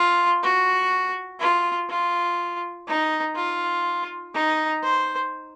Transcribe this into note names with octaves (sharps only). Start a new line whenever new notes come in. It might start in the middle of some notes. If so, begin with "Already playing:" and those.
Already playing: F4
F#4
F4
F4
D#4
F4
D#4
C5